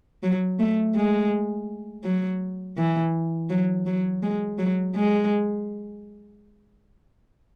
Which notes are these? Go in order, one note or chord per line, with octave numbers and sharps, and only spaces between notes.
F#3
A3
G#3
F#3
E3
F#3
F#3
G#3
F#3
G#3